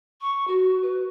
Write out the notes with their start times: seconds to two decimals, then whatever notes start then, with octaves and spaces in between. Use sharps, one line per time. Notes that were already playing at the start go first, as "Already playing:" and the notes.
0.21 C#6
0.47 F#4
0.82 B4